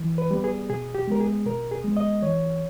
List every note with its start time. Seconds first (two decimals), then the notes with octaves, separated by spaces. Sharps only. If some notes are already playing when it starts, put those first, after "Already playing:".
Already playing: E3
0.18 B4
0.31 G3 B3
0.44 G#4
0.69 B2 G#4
0.95 G4
1.08 G#3 B3 A#4
1.20 G#4
1.46 B2 A#4
1.71 G#4
1.84 G#3 B3
1.97 D#5
2.22 E3 C#5